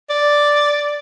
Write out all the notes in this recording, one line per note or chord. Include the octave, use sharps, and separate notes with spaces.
D5